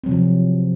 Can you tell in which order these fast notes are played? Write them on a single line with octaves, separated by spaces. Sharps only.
C4 F#3 C3 F3